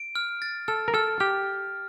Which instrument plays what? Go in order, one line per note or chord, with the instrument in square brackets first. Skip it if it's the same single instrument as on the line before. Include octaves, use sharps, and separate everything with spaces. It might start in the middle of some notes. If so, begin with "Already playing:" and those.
Already playing: [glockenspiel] D7
F6
A6
[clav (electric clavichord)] A4 [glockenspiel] F6
[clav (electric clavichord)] A#4
[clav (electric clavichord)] A4 [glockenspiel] F6
[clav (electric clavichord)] G4 [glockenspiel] F6